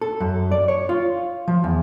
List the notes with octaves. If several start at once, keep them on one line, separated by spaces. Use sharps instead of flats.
A4
F#2
D5
C#5
F4
F3
E2